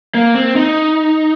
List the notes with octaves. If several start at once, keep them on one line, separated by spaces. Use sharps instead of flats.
A#3
C4
D#4